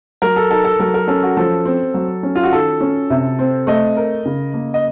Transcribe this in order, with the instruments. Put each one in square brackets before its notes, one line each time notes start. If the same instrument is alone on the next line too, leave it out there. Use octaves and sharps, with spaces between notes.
[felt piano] F#3 [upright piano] A#4
[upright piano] A4
[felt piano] D#4 [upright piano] A4
[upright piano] A4
[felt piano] F#3 [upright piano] A#4
[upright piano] A#4
[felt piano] C#4 [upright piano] A4
[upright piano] F#4
[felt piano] F3 [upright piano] A4
[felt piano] C4
F#3
C#4
[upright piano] F4
F#4
[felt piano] D#3 [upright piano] A4
[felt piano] C#4
C3
C4
[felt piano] A3 [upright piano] D#5
[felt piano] A#4
C#3
A#3
[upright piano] D#5